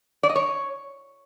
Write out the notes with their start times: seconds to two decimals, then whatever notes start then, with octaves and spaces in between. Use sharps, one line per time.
0.23 D5
0.29 D#5
0.36 C#5